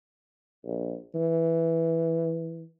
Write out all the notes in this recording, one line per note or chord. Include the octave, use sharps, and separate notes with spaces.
A#1
E3